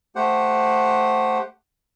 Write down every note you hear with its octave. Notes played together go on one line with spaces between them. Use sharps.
A3 G4 C5 F#5